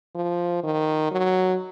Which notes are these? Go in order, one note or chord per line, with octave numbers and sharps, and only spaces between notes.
F3
D#3
F#3